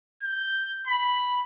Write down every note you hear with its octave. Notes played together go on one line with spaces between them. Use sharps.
G6
B5